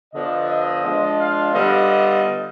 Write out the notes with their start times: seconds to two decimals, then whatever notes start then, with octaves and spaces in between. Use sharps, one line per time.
0.14 D3 F3 B3 F4 D#5
0.49 D#5
0.84 F3 G#3 D4 F4
1.18 F5
1.53 D3 G3 B3 F4 D#5
1.89 D#5